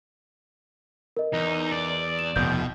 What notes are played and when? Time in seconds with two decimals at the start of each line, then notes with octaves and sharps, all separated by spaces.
1.17 A#4 D#5
1.33 E2 D#4
1.72 D5
2.19 E7
2.36 F1 D#2 B2 G6